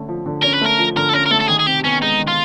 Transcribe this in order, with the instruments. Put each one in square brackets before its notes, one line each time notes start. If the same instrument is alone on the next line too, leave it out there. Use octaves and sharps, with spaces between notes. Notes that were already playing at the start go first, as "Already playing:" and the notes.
Already playing: [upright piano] D3 A3 C#4
F3
D3
[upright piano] C#4 [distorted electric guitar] A#4
[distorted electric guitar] B4
[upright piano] A3 [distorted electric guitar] A#4
[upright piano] F3
[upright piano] D3 [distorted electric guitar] A#4
[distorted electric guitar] A4
[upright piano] C#4 [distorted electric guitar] A#4
[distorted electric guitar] A#4
[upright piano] A3 [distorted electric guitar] A4
[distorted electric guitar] A4
[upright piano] D#3 [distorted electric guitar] G#4
[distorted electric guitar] G#4
[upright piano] C3 [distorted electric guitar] G4
[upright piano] B3 [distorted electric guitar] C#4
[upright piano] G#3 [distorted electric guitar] D#4
[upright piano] D#3
[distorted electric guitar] F4